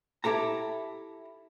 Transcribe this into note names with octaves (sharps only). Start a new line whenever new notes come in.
E4 G4 A4 A#5